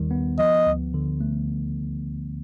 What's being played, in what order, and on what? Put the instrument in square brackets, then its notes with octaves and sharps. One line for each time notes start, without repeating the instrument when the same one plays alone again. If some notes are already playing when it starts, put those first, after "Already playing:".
Already playing: [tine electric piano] D#2 D#3 G3
B3
[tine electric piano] F3 [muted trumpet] D#5
[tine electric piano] D2
D3
A3